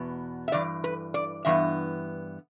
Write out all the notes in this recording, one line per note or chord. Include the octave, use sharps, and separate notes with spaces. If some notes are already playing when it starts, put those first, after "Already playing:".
Already playing: E2 B2 B3
E5
G2 E3 D5
B4
D5
G2 E3 B3 E5